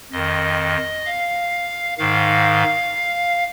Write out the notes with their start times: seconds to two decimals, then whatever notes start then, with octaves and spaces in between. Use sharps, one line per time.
0.12 F2 D#3 D#5
1.06 F5
1.98 G#2 D#3 F5